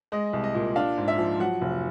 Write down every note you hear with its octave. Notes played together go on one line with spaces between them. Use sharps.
G#3 D#5
C2
D#5
A#2
D4 F5
G#2
E5
F3
F#3 F#5
F1